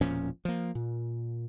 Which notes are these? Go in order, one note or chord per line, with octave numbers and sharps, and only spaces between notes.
E1 A#2 F3 C#4
F3 A#3
A#2